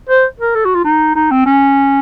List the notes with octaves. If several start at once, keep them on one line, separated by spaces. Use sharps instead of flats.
C5
A#4
A4
F#4
F4
D#4
D#4
C4
C#4